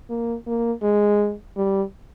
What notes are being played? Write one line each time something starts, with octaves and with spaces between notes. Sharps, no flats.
A#3
A#3
G#3
G3